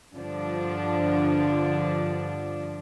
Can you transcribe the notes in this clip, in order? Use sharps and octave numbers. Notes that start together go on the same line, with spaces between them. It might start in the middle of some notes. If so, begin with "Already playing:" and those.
G2 D3 F3 D4